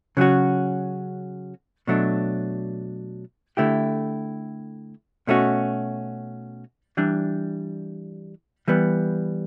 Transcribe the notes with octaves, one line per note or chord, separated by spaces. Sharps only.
C#3 F#3 C#4 F#4
B2 F#3 A3 D4
D3 A3 E4 G4
B2 A3 C#4 F#4
E3 G3 D4
E3 G3 B3